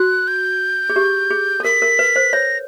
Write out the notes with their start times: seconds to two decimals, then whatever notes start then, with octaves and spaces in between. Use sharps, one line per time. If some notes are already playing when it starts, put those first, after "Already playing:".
Already playing: F#4 F#6
0.28 G6
0.90 G#4
0.96 G4
1.30 G#4
1.60 A4
1.64 A#4 B6
1.82 A#4
1.99 B4
2.16 C5
2.33 C#5 A#6